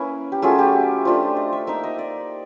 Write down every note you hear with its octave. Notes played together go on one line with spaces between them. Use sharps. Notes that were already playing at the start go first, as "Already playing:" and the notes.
Already playing: A#3 C#4 E4 B4
G4
F#3 A3 C#4 F4 G#4
G4
A3 D4 F4 C5
D#5
E5
A#3 D#4 E5
D#5
D5